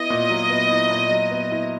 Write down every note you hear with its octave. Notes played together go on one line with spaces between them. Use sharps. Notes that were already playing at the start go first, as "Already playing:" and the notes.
Already playing: B3 E4 D#5
A#2
F#3
B3
E4
A#2
F#3
B3
E4